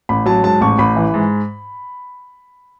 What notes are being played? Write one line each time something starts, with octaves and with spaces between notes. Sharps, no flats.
A1 B5
F#3 A5
G#2 A5
A1 C#6
A1 B5
E3
G#2